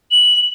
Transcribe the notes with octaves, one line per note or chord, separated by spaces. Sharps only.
F#7